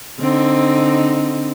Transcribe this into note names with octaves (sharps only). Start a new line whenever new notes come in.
D3 C4 D#4